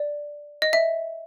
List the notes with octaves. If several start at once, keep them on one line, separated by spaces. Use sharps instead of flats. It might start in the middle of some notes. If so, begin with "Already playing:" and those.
Already playing: D5
D#5
E5